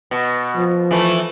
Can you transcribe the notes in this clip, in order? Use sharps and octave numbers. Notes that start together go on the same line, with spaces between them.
B2
F3
E3 A3